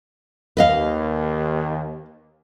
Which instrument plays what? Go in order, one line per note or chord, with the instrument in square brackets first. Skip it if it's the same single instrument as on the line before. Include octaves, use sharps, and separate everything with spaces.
[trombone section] D#2 [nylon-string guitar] B4 D#5 F5